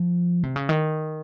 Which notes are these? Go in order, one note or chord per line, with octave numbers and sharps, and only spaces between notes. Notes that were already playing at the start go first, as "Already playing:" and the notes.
Already playing: F3
C3
C#3
D#3